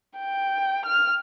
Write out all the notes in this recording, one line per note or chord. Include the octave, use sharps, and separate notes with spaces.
G5
F6